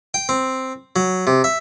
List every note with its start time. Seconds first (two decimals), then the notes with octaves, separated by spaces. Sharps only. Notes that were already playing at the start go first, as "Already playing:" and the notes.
0.14 G5
0.29 C4
0.96 F#3
1.27 C3
1.44 E5